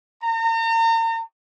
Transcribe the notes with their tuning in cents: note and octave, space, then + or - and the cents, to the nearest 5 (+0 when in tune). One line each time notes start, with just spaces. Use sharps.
A#5 -40